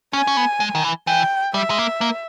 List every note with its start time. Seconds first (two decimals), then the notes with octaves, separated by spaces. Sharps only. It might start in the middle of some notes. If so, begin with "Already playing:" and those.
0.13 C#4 G#5
0.27 C#4
0.37 B3
0.60 G#3
0.75 D#3
0.84 E3
1.07 E3 G5
1.54 G3 E5
1.70 G#3
1.78 A#3
2.01 A#3